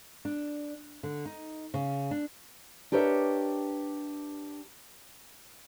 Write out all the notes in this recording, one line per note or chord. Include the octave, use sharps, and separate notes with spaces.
D4
D3
D#4
C#3
D4
D4 G4 A#4 B4 C#5 E5